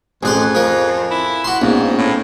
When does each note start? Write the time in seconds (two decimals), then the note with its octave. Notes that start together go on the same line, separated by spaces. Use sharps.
0.23 A1 F2 G#4 C5 G#5 F#6
0.55 F3 A#4
1.11 E4
1.44 F#4 C6
1.61 A#1 G#2 B3 C#4 F5
1.98 A2